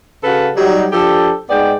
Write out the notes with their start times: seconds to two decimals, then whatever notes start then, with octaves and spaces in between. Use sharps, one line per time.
0.24 C#3 F#4 A4 B4 F5 F#5
0.56 F#3 G3 D#4
0.93 F3 D4 G4 A4
1.49 G#2 G#3 B3 D5 G5